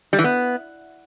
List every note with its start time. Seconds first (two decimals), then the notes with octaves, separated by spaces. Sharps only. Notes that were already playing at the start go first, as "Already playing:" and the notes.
0.13 G3
0.19 E3
0.24 B3